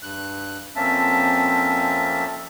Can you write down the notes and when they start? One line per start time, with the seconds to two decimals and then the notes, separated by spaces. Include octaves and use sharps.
0.02 G2 F#6
0.76 F2 A#3 C4 C#4 E5 A5